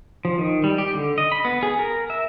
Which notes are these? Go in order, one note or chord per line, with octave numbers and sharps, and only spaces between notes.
F3
D#3
G3
G4
D3
D#5
B5
B3
G#4
A#4
E5